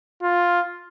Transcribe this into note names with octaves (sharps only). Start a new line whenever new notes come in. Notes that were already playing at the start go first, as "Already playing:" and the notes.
F4